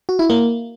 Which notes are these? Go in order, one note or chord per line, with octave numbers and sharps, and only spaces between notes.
F#4
E4
A#3